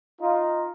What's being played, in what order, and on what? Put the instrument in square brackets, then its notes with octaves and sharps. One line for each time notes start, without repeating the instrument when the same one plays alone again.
[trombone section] D#4 F4